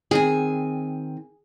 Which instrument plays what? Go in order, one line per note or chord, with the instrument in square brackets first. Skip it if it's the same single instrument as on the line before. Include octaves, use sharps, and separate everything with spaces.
[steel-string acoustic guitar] D#3 C4 G#5 [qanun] G#4